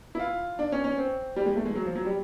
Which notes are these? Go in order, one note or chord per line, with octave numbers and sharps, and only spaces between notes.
E4
F4
D4
C#4
C#4
C4
G3
G#3
A3
G#3
F#3
F3
F#3
G3